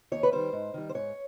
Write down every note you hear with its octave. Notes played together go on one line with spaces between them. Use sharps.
D#2 C#5
B4
D#3 G3 C5
G#2
D#3 G3
C5
G#2 C#5